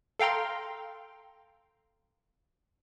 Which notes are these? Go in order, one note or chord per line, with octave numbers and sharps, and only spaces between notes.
A4 F5 G5 A#5 C6